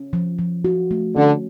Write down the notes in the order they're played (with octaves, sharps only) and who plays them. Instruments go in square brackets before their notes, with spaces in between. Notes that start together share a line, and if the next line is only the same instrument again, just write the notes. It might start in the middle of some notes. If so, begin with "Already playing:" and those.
Already playing: [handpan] C#4
F3
F3
F#4
A3
[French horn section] D3 [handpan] C#4